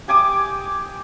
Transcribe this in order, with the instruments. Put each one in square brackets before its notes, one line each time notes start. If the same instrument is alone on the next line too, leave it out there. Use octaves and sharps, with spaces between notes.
[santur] G4 G#5 D6 D#6